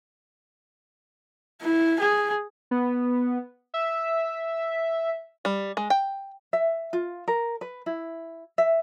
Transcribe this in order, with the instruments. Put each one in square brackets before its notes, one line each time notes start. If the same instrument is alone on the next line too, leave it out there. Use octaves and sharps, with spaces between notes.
[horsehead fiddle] E4
G#4
[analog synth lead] B3
E5
[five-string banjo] G3
G#3
G5
[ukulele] E5
F4
A#4
B4
E4
E5